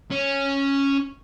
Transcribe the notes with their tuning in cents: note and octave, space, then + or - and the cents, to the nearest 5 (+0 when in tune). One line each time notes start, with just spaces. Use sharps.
C#4 -5